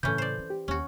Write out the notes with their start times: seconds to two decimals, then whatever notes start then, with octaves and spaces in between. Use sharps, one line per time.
0.03 A2 C#3 E3 C#4 A4 G6
0.18 C5 D5
0.38 C#4
0.50 G4
0.68 D#2 A#3 C#4 F#4